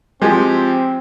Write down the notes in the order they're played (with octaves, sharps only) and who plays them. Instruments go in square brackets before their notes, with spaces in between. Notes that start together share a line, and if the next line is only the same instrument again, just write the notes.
[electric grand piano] F3 G4 [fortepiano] G#3 [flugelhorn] C4